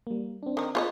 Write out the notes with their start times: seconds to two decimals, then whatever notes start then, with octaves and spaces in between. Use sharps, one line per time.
0.07 G3 A#3
0.43 C4 D4
0.57 D#3 D#4
0.75 F4 C#5 D#5 B5